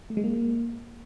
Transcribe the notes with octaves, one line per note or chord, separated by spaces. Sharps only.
A3
G#3
A#3